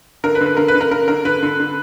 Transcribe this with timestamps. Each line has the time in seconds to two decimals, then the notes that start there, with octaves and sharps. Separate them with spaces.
0.24 D3 A#4
0.35 B4
0.41 D3
0.46 B4
0.57 D3 A#4
0.68 B4
0.74 D3
0.81 A#4
0.91 D3 A#4
1.08 D3 A#4
1.25 D3 B4
1.43 D3
1.60 D3